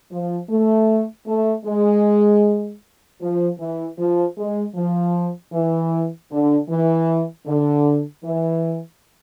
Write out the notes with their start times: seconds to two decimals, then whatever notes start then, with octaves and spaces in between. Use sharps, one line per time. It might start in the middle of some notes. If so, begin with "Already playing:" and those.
0.12 F3
0.49 A3
1.27 A3
1.65 G#3
3.21 F3
3.60 E3
3.99 F3
4.37 G#3
4.75 F3
5.53 E3
6.31 D3
6.69 E3
7.47 D3
8.24 E3